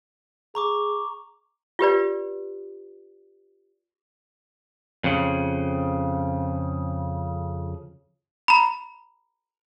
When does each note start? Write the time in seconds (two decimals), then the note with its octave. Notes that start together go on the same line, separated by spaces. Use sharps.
0.55 G#4 A#5 C#6 D6
1.79 F4 G4 B4 D5
5.04 F2 C#3
8.48 A#5 B5